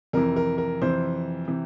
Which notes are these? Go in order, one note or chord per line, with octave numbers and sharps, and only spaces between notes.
F2 C3 E3 A#4
A#4
A#4
F2 C3 E3 C5
C3 E3